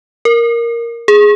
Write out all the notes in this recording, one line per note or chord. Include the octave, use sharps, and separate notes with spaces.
A#4
G#4